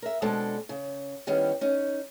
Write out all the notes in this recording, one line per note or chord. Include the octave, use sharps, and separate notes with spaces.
A#4 E5
B2 G#3 C4 D4 A4
C#3
D#3 G3 B3 C#4 E4 G4
C#4 D#4